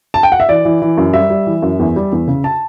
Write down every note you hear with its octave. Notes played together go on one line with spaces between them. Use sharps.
A5
G5
F#5
E5
E3 D5
E3
E3
F#2
G3 E5
G3
E3
F#2
E2
G3
E2
C#3
A5